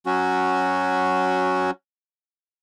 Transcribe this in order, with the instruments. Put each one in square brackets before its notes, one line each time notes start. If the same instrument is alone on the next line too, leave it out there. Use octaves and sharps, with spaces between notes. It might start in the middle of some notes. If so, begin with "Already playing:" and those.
[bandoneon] F#3 C#4 F#4